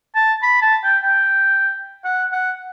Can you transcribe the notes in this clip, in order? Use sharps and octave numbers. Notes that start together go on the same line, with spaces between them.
A5
B5
A5
G5
G5
F#5
F#5